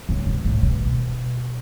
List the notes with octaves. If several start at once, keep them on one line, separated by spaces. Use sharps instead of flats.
C#3
B2
A2
B2